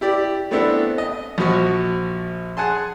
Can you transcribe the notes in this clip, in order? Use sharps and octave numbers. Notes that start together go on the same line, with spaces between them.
E4 G4 D5
A3 B3 C4 D4 E4 A4
D#5
A#1 F3 F#4 C#6
G#4 F#5 G#5 A5 C6